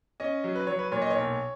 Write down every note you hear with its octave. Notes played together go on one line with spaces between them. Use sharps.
C#4 D#5
F#3
B4
F#3 C#5
B4
A#2 C#5
D#5
C#5
B1